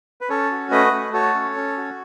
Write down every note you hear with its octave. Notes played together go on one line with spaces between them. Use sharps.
B4
C#4 A4 C#5
F#4
A3 B4 D#5
A3
F#4 A4 C#5
C#4
C#4
F#4